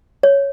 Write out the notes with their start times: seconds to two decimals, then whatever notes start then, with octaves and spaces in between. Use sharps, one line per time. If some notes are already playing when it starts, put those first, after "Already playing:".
0.23 C#5